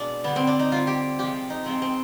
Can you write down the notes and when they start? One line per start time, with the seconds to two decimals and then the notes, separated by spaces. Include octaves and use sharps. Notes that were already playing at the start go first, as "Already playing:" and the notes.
Already playing: B2 G#3 D4
0.24 D3 G3 B3
0.36 C4
0.47 D4
0.59 D#4
0.71 D3 G3 F4
0.87 G4
1.19 C3 F3 G#3 G4
1.50 D#4
1.65 C3 F3 G#3 C4
1.82 C4